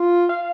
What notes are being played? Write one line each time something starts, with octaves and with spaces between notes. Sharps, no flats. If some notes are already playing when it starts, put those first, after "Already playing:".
Already playing: F4
F5